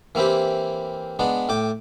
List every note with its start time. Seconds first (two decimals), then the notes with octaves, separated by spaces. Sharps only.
0.15 E3 A#3 C4 E4 G4
1.19 G#3 B3 D4
1.49 A2 G5 D6